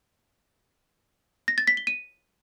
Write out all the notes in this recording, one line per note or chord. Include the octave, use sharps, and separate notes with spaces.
A#6
A6
B6
G7
D#7